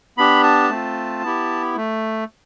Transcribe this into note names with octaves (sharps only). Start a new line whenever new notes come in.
B3 D4 G4 B5
A5
A3 C4 F4
B3 E4 G4
A3